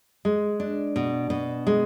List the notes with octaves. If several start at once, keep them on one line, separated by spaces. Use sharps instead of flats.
G#3
D4
B2
B2
G#3